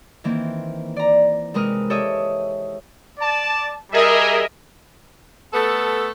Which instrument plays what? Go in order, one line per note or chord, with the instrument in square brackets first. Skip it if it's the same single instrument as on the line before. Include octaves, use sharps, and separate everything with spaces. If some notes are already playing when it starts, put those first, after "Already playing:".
[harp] D#3 E3 A#3 C4
D5 A#5
C3 G#3 A#4 B4 D#6 F6
G4 A4 C#5 D#5 E5 D#6
[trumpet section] D5 A5
[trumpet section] G3 G#4 [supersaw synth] A#4 D#5 E5
[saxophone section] A3 B3 A4